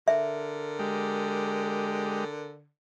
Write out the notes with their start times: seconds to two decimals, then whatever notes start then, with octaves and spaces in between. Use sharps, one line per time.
0.08 D3 A#4 E5
0.79 G#3 G4